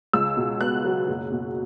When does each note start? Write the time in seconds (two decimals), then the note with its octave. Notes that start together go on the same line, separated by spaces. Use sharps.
0.13 C#2 E6
0.37 B2
0.61 B3 F#6
0.84 F#3
1.08 F#1
1.32 B2